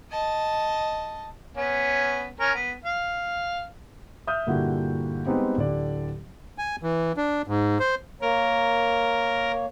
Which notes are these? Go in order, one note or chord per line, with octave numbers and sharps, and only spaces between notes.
D#5 A5
B3 C#4
C#4 A#4
B3
F5
E5 D#6 F6 G6
G2 A#2 D3 E4 F#4 G4
G3 G#3 B3 C4 D#4 G4
D1 D3 G4 D5
G#5
E3
D4
G#2
C5
A#3 A#4 C#5